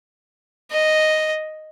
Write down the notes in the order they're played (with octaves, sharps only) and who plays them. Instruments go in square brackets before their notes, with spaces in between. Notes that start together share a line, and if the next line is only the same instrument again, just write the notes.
[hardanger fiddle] D#5